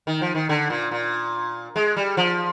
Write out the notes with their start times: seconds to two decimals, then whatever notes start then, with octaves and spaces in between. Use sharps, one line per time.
0.07 D#3
0.21 F3
0.35 D#3
0.49 D3
0.70 A#2
0.91 A#2
1.76 G#3
1.97 G3
2.17 F3